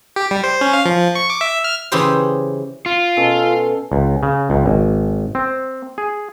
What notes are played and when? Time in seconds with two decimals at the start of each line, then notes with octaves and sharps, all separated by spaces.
0.16 G4
0.31 G3
0.43 C5
0.61 C#4
0.73 F5
0.85 F3
1.15 C#6
1.30 D6
1.41 E5
1.64 F6
1.92 C#3 E3 E4 G4 G#4 C5
2.86 F4
3.17 B2 C#4 A4
3.92 C#2
4.23 C#3
4.50 C#2
4.66 G#1
5.35 C4
5.98 G#4